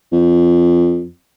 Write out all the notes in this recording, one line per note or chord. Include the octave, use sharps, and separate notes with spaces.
F2